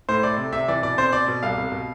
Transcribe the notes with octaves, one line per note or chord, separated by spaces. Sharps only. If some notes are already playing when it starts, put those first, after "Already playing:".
A2 C5
A3 D5
C3
C3 E5
E3 D5
B2 D5
C4 C5
B2 D5
B2
C2 F5
C2
B2